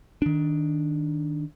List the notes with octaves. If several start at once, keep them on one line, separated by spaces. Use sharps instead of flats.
D#3 D4